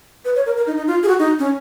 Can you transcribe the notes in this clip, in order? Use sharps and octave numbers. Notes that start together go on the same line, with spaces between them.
B4
C#5
A#4
A#4
D#4
D#4
F4
G#4
F#4
D#4
C#4